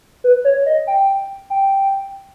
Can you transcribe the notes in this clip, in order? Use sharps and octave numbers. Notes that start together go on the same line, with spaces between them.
B4
C#5
D#5
G5
G5